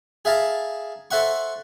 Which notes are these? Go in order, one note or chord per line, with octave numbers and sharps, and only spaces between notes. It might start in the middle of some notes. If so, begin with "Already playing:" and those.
G#4 E5 F5 A5 A#5
A4 C5 E5 F#5 C#6